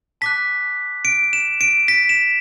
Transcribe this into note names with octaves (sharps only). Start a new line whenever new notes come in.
A5 D6 F#6 B6
D7
E7
D7
B6
E7